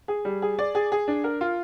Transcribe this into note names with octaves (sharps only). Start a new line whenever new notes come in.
G#4
G3
G#4
D5
G#4
G#4
D4
A#4
F4